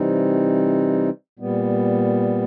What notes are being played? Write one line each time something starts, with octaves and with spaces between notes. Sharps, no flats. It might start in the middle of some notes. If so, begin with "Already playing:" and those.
Already playing: C3 E3 G3 C4 D#4
A#2 G3 B3